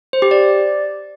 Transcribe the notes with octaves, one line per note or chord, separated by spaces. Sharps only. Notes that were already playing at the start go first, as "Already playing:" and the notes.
C5
G4
D5